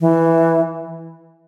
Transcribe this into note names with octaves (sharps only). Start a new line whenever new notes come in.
E3